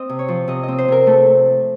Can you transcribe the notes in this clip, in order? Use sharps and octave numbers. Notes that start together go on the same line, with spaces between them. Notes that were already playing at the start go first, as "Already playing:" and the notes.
Already playing: C4 D#5
C3
C#5
F3
C3 D#5
C4 D#5
C5
C3 A#4
A3 A4